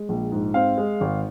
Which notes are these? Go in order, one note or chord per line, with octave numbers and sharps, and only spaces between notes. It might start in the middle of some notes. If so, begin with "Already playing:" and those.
Already playing: G#3
A#1
G#2
C4 F5
G#3
G#1